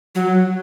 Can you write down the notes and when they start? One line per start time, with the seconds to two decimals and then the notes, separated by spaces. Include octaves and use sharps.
0.15 F#3